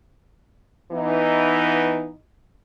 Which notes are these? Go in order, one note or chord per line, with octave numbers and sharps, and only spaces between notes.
E3 B3 D#4